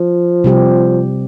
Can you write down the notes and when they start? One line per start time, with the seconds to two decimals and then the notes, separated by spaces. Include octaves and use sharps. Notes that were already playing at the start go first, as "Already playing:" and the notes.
Already playing: F3
0.44 C3 G3 C4 G4